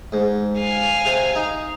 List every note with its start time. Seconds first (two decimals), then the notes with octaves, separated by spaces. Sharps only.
0.12 G#2
0.60 F5 G#5
1.05 C3
1.35 D#4